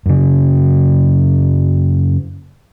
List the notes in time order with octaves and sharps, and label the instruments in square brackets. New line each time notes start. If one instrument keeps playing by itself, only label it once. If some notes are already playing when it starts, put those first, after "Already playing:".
[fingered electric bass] F#2 C#3